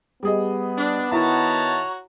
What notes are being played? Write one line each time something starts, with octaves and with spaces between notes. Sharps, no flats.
G3 B3 G#4 D#5
D4
D#3 E4 F#4 C#5 A5 A#5